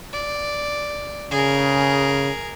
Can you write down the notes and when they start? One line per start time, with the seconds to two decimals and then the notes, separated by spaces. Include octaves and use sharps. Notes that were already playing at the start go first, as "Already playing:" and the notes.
0.13 D5
1.31 C#3 G#4 A#4